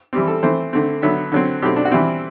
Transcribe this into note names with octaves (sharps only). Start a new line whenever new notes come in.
E3 G3 C4 G4
A4
E3 A3 C4 C5
D3 A3 C4
D3 F#3 B3 E5
D3 F#3 C4
B2 F#3 A3 C4 G4
D4
F#4
E3 G3 C4 E4